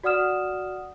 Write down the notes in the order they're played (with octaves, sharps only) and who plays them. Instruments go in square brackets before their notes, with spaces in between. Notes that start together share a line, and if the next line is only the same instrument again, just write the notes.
[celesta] F#4 D5 F#5 D#6 F6 E7